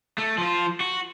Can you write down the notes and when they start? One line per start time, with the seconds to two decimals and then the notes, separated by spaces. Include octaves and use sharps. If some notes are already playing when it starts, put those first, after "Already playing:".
0.18 A3
0.38 F3 F4
0.80 F#4